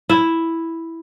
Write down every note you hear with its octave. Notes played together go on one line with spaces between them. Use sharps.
E4